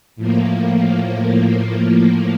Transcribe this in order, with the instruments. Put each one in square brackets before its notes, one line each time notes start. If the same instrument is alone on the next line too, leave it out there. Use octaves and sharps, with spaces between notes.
[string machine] A2 F3 A#3